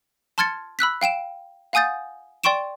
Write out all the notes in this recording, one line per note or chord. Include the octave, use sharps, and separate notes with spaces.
A5 C6 F6 G#6 A6 C#7
B5 E6 F#6 B6
F5 G5 D7 E7
F5 F#5 G#5 D#6 G6 A6
D5 G5 C6 C#6 D7 E7